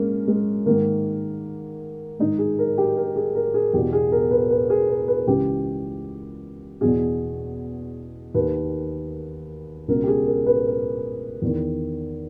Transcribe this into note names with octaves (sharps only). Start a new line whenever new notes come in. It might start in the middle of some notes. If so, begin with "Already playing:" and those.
Already playing: G#3 A#3 C#4
G#3
G#2 D#3 A#3
G#2 D#3 D#4
G#4
A#4
G4
A#4
G#4
A#4
G#4
E2 B2 G4
G#4
A#4
B4
B4
G#4
A#4
B4
C#2 C#3 E3 G4
E2 B2 G#4
D#2 D#3 B4
C#2 B2 A#4
G4
G#4
A#4
B4
A#4
E2
D#3